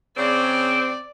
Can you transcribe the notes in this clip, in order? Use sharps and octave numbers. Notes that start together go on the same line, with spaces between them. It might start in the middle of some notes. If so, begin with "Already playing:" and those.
C#3 C4 D5